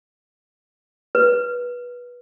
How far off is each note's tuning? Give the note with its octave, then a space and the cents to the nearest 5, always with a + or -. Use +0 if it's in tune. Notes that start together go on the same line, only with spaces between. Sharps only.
B4 -20